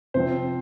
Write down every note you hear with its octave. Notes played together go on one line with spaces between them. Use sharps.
C3 F3 C4 C5